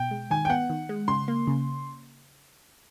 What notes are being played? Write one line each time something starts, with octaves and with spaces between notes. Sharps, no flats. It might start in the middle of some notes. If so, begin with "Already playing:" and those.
Already playing: B2 G5
G#3
D#3 G#5
G5
B3 F#5
D#3
G#3
C#3 C6
A#3
C#3